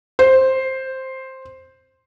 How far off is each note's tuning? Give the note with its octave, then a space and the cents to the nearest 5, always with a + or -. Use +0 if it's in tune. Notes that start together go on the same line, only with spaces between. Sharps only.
C5 +5